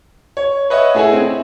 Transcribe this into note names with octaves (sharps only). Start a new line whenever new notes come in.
C#5
B4 C#5 D#5 E5 F#5
A3 E4 G#4 E5 G#5
C4